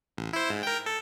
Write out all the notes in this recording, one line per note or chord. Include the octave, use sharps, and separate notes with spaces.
A1
E4 C5
G#2
A#4 G5
A4